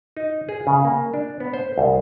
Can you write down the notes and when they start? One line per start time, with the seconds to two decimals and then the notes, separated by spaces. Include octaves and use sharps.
0.17 D#4
0.49 G#4
0.67 C#3
0.85 A#3
1.14 D4
1.40 B3
1.54 C5
1.78 C2